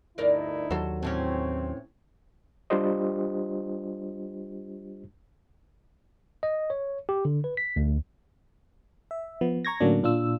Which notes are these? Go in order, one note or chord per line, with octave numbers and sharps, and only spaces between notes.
D2 G2 D#4 E4 A#4 D5
D#2 F#3 A4 C5
A2 E3 C4 C#4
G3 D4 F4 G4 C5 D#5
D#5
C#5
G4
D3
B4
B6
D2
E5
F3 B3
A#5 C#6 G#6 A#6
A2 D3 F#3 A#3 C#4 D4
A#2 D4 F4 E6